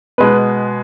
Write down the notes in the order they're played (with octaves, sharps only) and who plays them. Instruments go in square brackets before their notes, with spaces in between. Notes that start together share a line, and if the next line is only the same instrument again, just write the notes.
[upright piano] B2 G#3 B3 B4